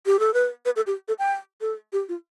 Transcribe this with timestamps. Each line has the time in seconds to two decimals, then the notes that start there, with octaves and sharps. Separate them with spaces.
0.06 G4
0.19 A4
0.34 B4
0.65 B4
0.76 A4
0.87 G4
1.08 A4
1.19 G5
1.61 A4
1.93 G4
2.09 F4